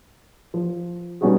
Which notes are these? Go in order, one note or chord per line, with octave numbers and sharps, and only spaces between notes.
F3
B2 G3 C#4 D#4 F#4 G#4